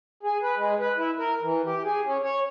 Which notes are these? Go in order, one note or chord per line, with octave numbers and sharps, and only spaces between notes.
G#4
B4
G#3
B4
E4
A#4
E3
G4
G#4
C#4
C#5